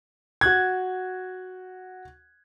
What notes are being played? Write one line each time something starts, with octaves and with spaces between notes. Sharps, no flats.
F#4 F#6 G#6